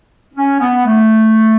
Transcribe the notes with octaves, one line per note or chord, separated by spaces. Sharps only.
C#4
B3
A3